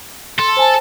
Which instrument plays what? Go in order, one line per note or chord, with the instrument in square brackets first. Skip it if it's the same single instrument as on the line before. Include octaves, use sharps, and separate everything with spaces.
[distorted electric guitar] A4 [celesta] C6
[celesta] C5 G#5 A5